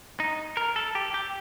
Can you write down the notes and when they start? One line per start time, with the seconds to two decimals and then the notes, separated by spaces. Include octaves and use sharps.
0.20 D#4
0.57 A#4
0.76 A4
0.95 G4
1.14 G4